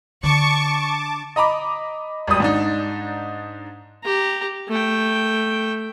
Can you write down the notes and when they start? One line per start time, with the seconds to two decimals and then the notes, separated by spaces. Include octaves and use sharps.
0.23 D3 A5 C#6 D6
1.36 D#5 A#5 B5 D6
2.27 G#1 G3 D#6
2.40 G#2 D4 D#4
4.03 G4 A#5
4.68 A3 G5